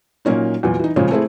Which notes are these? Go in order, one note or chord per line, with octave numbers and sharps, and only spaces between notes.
A#2 F#3 A#3 C#4 D#4
E2 A#2 F#3
E3 D#4
A#2 C#3 F3 G#3 C4 C#4
A3 C4 E4 G#4